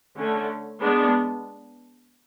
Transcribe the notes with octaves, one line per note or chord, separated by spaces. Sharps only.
D3 A3 C#4
G#3 B3 D4